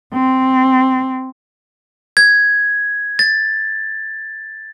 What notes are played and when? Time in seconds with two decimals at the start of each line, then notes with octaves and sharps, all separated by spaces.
0.14 C4
2.17 G#6
3.19 A6